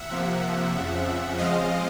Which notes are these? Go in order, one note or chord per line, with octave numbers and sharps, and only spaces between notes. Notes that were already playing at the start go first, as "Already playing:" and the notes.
Already playing: E5 F#5
C3 F3 A#3
F2 C#3 F3
C#3 F3 G#3 C4 D#5 F5